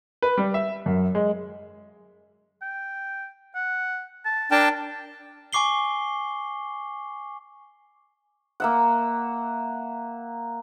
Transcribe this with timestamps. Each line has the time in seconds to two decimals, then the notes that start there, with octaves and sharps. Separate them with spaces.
0.22 B4
0.37 G3
0.54 E5
0.86 F#2
1.15 G#3
2.62 G5
3.55 F#5
4.25 A5
4.51 D4 A#4 G5 A5
5.53 G#5 C#6 D6 C7 G7
8.60 A#3 E5 F#5